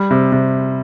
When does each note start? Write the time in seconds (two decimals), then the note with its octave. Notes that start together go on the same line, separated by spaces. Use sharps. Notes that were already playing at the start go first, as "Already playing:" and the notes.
Already playing: G3
0.11 C3
0.32 C3